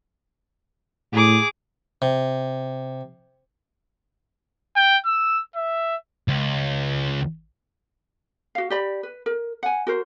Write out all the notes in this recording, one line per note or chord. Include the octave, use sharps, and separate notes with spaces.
A2 G#4 D6
C3
G5
E6
E5
C#2
F#4 F5
G4 D5 B5
B4
A#4
F#5 G#5
F#4 A#4 C5